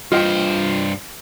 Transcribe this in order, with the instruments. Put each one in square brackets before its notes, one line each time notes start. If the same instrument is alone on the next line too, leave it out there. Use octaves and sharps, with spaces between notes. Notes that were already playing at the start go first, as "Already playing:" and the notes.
[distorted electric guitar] G2 C5 [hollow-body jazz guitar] F4 D#5 G5